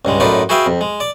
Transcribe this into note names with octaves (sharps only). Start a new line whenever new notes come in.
C#2 G2 G#3
F#2 A2 D#4 F4 B4 D5
F#4 G#4 B4 E5 F5 G5
F2
G#3
D5